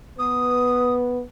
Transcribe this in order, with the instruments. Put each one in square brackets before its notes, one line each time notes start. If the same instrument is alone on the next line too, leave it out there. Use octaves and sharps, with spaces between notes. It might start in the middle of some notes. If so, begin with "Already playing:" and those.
[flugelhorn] B3 [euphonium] B4 [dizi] D#6